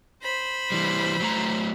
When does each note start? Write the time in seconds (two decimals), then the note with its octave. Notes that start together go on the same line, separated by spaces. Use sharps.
0.23 C5 B5
0.72 E3 G3
1.20 F#3 A3 A#5